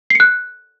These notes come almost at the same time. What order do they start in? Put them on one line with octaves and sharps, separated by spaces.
C7 C#7 F#6